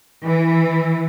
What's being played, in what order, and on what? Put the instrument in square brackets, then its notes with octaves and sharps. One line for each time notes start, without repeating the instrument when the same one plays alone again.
[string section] E3